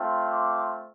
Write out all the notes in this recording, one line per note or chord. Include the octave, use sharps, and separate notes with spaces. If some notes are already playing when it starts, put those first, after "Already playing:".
Already playing: A3 C4 F4
D6